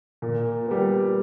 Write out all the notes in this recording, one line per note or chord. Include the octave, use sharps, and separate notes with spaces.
A#2
G3 B3